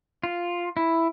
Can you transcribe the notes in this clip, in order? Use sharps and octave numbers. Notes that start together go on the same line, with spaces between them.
F4
E4